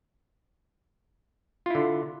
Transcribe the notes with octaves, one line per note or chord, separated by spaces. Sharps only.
D3 E4 F4